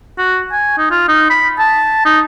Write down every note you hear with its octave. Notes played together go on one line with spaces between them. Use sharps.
F#4
G#5
D#4
F4
D#4
B5
A5
D#4